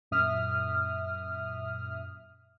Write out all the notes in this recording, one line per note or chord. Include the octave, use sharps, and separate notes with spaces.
F#2 A#2 E5 D#6 F6